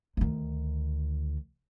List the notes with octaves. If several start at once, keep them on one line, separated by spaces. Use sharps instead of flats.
D2 D#3